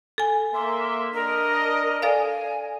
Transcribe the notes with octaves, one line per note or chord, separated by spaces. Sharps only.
A4 G#5
A#3 E5 C6
D4 A#4 D#5
A4 D5 F5 G#5